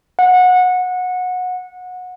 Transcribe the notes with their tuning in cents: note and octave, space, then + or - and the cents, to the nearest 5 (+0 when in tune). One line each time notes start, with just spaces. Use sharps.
F#5 -20